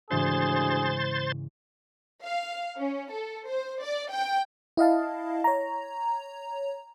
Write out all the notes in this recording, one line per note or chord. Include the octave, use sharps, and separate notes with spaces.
D2 G#2 C#3 E3 G#4 C5 C6 A6
F5
C#4
A4
C5
D5
G5
E4 D#5 F5 A5
C#5 A#5